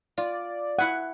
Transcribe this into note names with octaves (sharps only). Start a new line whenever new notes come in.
F4 D5
E4 F#5 G#5